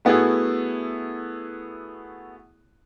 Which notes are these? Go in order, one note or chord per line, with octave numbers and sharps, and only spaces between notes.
A3 B3 E4 F#4 G#4